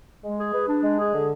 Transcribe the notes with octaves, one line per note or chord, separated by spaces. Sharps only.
G#3
G#4
B4
D4
G#3
G#4
D3